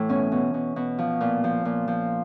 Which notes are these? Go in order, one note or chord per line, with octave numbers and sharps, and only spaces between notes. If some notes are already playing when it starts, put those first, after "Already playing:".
Already playing: A2 E3
B2 C#4
B2
B2
B2
F3
A#2
F3
A#2
F3